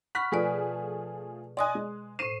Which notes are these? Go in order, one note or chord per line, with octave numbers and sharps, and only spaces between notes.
F#5 B5 C#6 F6 F#6 B6
B2 F3 A3 G#4 B4 D5
D5 D#5 G#5 C6 D#6 F#6
G#3
A2 C5 C7 D#7 E7